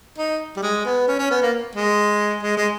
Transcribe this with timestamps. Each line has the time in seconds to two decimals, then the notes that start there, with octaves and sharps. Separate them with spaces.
0.18 D#4
0.57 G3
0.63 G#3
0.85 B3
1.08 C#4
1.19 C#4
1.31 B3
1.42 A#3
1.75 G#3
2.43 G#3
2.57 G#3